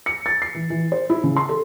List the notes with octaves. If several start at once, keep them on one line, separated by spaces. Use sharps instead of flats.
C#7
A6
C7
E3
E3
C5
E4
C#3
C6
A4